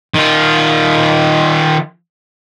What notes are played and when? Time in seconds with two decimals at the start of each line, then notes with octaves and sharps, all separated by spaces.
0.14 D#3 F4